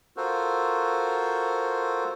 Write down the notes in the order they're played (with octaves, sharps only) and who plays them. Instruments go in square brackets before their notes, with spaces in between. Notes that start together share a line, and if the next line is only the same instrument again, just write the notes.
[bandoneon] F4 F#4 A4 A#4 C5